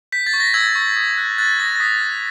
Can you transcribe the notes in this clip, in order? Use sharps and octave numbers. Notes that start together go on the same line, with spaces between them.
G6 B6
A6
C#6
A#6
E6 G#6
C#6
D#6
F#6
F#6 A6
D#6 A#6
A#6
D#6 B6
F#6